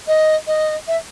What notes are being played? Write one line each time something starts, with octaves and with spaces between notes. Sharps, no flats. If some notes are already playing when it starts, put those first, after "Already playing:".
D#5
D#5
E5